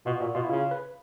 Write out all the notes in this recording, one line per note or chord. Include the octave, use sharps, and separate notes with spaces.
B2 F4
A#2 F#4
B2 F4
E4
C#3 F4
B4